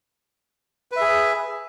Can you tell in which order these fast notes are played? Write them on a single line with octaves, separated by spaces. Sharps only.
B4 E5 G#4